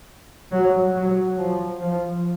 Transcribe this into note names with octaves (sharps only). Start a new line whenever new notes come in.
F#3
F#3
F3
F3